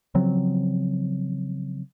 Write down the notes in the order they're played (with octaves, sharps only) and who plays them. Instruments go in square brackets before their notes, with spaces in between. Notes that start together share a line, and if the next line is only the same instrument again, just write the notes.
[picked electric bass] C#3 F3 F#3 C4